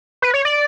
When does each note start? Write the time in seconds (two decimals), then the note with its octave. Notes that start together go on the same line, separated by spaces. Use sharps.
0.22 B4
0.34 C#5
0.45 D5